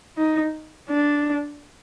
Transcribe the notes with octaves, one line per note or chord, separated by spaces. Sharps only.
D#4
D4